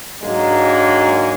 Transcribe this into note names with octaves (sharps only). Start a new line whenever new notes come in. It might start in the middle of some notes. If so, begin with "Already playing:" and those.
G#2 F#3 G#3 A#3 D4